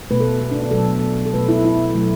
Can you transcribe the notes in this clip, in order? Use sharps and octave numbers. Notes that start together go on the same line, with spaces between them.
B2 A3 B4
A4
B3
D4
D4
B2 F#3 A3 A4
A4
B2 A3 B4
E4
E4
B2 F#3 A3